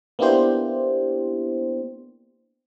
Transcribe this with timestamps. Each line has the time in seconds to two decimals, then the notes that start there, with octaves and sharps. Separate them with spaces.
0.19 A#3 B3 D4 E4 G4 C5